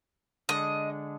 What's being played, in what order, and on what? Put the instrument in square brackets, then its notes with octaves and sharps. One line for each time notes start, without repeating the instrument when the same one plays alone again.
[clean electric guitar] D3 G#3 D4 [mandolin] D#5